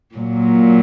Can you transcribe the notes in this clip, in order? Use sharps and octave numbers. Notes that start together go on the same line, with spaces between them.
A#2 F#3